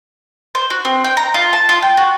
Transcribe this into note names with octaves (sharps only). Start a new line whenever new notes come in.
C5
F#4
C4
G5
A#5
F4
A5
F4
G5
F#4